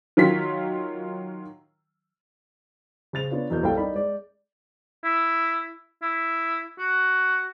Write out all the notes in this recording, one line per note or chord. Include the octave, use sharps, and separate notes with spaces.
D#3 F#3 F4 B6
C#3 C5 A6 F7
B3 D4 F4 C#5
E2 B2 A#4 G6
C2 A4 F5 G5
D#4 A#4 D5 B5
G#3 D5
E4
E4
F#4